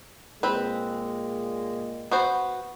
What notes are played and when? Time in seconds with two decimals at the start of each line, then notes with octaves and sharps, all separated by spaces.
0.43 A#2 G#3 C4 B4
2.11 B3 F#4 C5